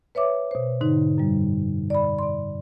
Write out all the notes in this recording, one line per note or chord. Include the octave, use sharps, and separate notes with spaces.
B4 C#5 E5 D6
B2 C5
G#2 D3 D#4
F#2 G3
D5 B5
D5 C6